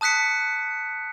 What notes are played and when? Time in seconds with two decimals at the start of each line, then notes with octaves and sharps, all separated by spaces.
0.01 A5 D#6 F#6 B6 C#7